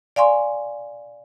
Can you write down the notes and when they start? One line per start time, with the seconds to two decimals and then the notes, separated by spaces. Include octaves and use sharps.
0.16 D5 F5 G#5 C6 C#6